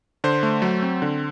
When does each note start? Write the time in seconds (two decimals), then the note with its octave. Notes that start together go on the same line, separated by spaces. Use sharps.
0.24 D3 C5
0.43 A3
0.62 F#3
0.82 C4
1.02 D3